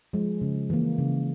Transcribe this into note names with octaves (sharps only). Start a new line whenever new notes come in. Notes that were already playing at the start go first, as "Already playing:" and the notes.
F3 G#3
C#3
E3 A#3
C#3